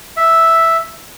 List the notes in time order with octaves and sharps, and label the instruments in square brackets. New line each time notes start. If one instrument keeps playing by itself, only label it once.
[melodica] E5